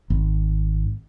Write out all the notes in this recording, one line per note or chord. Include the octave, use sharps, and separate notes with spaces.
G#1